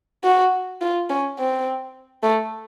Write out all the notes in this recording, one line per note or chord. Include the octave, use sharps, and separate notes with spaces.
F#4
F4
C#4
C4
A3